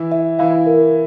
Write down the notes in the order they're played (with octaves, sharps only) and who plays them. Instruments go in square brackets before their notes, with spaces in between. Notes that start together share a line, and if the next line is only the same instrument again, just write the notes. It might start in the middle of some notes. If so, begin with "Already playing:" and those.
Already playing: [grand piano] E3 E4
[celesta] E5
[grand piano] E3 E4 [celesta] F5
[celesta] A#4